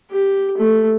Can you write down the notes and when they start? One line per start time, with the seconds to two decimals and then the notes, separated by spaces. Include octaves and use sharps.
0.11 G4
0.57 A3